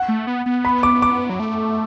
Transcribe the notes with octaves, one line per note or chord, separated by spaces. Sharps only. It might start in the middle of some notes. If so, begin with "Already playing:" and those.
Already playing: F#5
A3
B3
B3
B5
D6
D6
F#3
A3